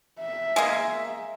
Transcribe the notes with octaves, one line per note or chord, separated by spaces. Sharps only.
E5
G#3 A#3